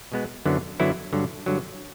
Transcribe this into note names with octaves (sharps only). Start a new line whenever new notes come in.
B2 G#3 B3
F#2 D3 F#3 B3 E4
F#2 D3 F#3 B3 E4
G2 D3 F#3
G2 D3 F#3